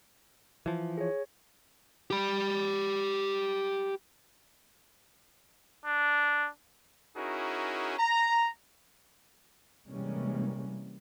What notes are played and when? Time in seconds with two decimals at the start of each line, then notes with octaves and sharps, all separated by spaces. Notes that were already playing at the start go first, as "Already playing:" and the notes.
0.66 E3 F3
0.98 G#4 C#5
2.10 G4 B5
5.86 D4
7.16 C#4 D#4 E4 F#4 G#4 A#4
7.98 A#5
9.89 C3 E3 G3 G#3 A#3 C#4